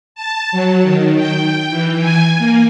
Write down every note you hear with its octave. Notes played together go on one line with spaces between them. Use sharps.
A5
F#3
D#3
G5
E3
G#5
A#3